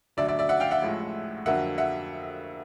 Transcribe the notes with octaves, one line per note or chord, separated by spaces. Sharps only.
D2 D3 F#3 D5 E5
D5 E5
D5 E5
E5 F#5
F5 G5
E5 F#5
A1 A2 F3 G#3
F2 D3 F#3 A#3 E5 F#5
E5 F#5